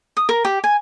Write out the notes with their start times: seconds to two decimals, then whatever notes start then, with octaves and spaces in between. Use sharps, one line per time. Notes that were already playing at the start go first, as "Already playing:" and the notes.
0.17 D#6
0.29 A#4
0.45 G4
0.64 G#5